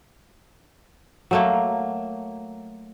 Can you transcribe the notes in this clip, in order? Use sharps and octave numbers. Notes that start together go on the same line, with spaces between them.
F#3 A3 A#3